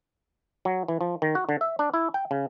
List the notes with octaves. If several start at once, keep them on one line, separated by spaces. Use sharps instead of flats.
F#3
E3
F3
D#3
F#4
D3
E5
D4
E4
G5
C#3